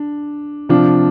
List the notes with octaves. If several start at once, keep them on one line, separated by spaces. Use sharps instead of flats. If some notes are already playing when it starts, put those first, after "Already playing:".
Already playing: D4
C3 F3 D4 F4